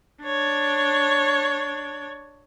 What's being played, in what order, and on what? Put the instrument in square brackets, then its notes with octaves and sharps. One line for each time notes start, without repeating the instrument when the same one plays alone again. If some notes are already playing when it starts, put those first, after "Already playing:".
[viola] D4 C#5